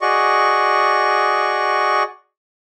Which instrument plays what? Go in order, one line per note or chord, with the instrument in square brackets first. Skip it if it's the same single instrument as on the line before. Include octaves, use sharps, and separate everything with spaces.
[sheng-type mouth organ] F#4 G#4 D5 D#5 C#6